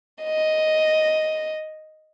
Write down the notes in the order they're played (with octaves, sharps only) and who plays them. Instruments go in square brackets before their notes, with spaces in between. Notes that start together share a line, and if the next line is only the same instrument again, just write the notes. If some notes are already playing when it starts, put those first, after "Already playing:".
[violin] D#5